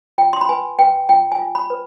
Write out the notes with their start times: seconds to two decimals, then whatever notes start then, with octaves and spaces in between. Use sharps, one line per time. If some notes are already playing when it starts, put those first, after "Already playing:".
0.18 F4 G5
0.33 C6
0.41 B5
0.49 B4 G#5
0.79 B4 G5
1.09 F4 G5
1.32 G#5
1.39 F4
1.55 B5
1.70 B4